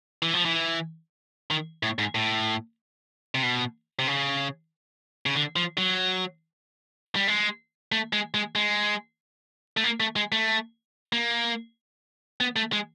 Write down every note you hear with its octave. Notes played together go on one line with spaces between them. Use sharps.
E3
F3
E3
D#3
A2
G#2
A2
C3
B2
C3
C#3
C#3
D3
F3
F#3
G3
G#3
A3
G#3
G#3
G#3
A3
A#3
A3
G#3
A3
A#3
B3
A3
G#3